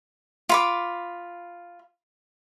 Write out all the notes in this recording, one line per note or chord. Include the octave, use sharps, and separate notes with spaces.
F4 B5 D6